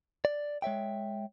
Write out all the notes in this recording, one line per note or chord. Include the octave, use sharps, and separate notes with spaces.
D5
G#3 C#5 E5 G5